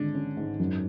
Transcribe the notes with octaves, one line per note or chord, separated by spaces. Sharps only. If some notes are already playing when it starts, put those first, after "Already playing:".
Already playing: G#1 D3 G#3
C#4
G#2
F#2